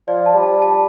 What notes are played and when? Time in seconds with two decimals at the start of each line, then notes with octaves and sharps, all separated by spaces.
0.08 F3 D5
0.26 A5
0.35 G3
0.43 A5
0.62 A5